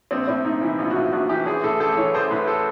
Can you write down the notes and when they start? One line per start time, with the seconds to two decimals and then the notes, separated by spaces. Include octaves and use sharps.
0.11 A#1 C4
0.28 A2 C4
0.45 A#1 D#4
0.62 E3 E4
0.79 A#1 F4
0.90 F#4
0.95 A2 F4
1.12 A#1 F#4
1.29 E3 G4
1.46 A1 G#4
1.63 A2 A4
1.80 A1 A4
1.97 E3 C#5
2.14 A1 C5
2.31 A2 B4
2.47 A4